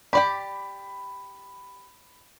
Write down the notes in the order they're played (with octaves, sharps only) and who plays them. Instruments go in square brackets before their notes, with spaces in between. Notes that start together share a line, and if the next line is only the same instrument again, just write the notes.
[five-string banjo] G4 D5 G5 [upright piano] B5